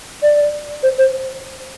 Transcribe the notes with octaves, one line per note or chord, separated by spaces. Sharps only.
D5
C5
C5